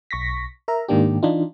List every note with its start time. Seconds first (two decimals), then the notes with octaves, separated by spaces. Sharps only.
0.11 B1 C#6 A#6 B6
0.68 A#4 E5 A#5
0.88 G#2 D#3 A#3 D4 G4
1.23 E3 D4 D#4 F4